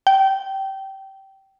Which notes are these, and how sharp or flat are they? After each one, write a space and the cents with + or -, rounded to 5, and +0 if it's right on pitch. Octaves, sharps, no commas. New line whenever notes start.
G5 -20